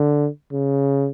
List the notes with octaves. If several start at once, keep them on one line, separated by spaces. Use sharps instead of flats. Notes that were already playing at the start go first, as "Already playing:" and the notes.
Already playing: D3
C#3